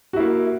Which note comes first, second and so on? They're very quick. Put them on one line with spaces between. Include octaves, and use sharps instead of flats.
F#4 E4 A#3